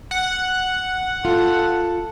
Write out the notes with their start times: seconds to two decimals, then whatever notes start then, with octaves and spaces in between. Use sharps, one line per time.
0.11 F#5
1.25 F4 A4